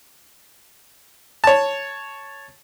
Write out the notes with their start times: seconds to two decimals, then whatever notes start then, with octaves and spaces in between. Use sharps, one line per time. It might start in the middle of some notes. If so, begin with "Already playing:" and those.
1.44 C#5 A5